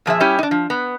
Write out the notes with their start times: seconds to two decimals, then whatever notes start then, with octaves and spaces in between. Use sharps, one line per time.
0.06 A#2 F3 G#4 E5
0.20 G3 C#4 E4 G4
0.39 D4 D#4
0.51 F3
0.70 B3